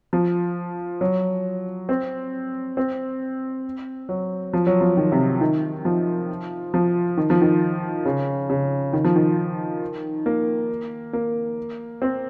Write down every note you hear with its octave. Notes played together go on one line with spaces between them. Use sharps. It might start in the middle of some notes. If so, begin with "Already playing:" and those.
F3
F#3
C4
C4
F#3
F3
F#3
F3
D#3
C3
D#3
F3
F3
D#3
F3
D#3
C#3
C#3
D#3
F3
D#3
A#3
A#3
C4